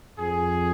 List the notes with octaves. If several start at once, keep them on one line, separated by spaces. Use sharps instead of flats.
F2 G#4